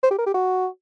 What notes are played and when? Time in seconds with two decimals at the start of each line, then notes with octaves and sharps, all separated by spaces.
0.03 C5
0.11 G4
0.18 A#4
0.26 G4
0.34 F#4